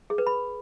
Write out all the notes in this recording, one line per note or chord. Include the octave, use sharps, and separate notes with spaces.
G#4
B4
B5